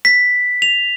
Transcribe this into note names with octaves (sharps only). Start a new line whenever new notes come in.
B6
F7